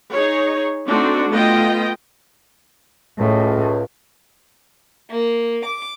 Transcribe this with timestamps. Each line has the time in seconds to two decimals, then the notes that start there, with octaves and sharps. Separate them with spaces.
0.12 D#4 G#4 C#5
0.88 A3 C4 D4 D#4 F#4
1.30 A3 B3 F4 D#5 G5
3.19 C#2 A2
5.09 A#3
5.64 D6